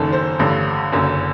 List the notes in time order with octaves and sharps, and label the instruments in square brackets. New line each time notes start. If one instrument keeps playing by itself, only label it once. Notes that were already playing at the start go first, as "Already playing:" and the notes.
Already playing: [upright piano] F#1 F#2 D#3 A4
C5
A1 G2 D3
F#1 F#2 D3